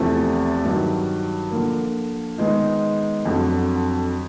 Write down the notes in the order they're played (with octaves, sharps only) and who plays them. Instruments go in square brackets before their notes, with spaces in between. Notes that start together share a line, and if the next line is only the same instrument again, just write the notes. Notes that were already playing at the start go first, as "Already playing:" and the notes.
Already playing: [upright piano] E2 C3 F3 A3 C4
G2 D#3 F#3
D3 F3 A#3
D#3 G#3 B3 D#4
F2 D3 F#3